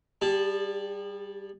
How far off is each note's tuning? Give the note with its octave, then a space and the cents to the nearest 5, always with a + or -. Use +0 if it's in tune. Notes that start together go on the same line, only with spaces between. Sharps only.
G3 +0 G#4 -40 A5 +0